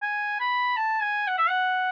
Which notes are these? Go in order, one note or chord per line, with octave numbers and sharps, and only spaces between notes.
G#5
B5
A5
G#5
F#5
E5
F#5